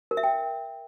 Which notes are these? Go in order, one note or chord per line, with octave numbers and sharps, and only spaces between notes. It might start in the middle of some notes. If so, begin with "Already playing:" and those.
A#4
E5
G5